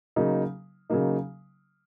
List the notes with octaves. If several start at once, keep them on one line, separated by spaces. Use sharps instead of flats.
C#3 F#3 A#3 D#4
C#3 F#3 A#3 D#4